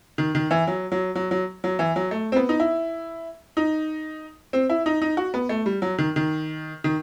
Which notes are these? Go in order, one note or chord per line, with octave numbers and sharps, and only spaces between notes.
D#3
D#3
E3
F#3
F#3
F#3
F#3
F#3
E3
F#3
A3
C4
B3
D#4
E4
D#4
C4
E4
D#4
D#4
F#4
B3
A3
G3
F#3
D#3
D#3
D#3